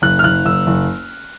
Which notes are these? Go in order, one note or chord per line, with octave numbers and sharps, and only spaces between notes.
F#1 F#6
F6
F#1 F#6
F#1 E6
F#1